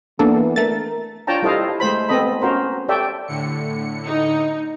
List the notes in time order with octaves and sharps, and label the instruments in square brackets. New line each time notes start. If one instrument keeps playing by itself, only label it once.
[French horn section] E3 B3 [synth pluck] A#3 D4 A4
[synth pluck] A3 A6 [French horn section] A#4
[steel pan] D4 F4 C#5 G5 A5 A#5
G3 E4 A4 C5 D#5 F5
G#3 A3 C5 B5
B3 C4 A4 D#5 B5
C#4 F#4 A#4 C5
G4 A4 C#5 D5 E5 G5
[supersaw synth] A2 D3 C#7
[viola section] D#4